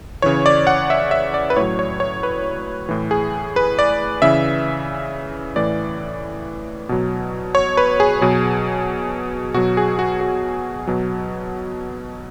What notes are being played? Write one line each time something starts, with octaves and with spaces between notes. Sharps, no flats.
C#3 E3 C#5
D5
F#5
E5
E5
D5
B4
A2 F#3 C#5
C#5
C#5
B4
A2 E3
G#4
B4
D5
C#3 E3 E5
A2 E3 D5
B2 F#3
C#5
B4
G#4
B2 F#3
B2 F#3 F#4
G#4
F#4
F#4
B2 F#3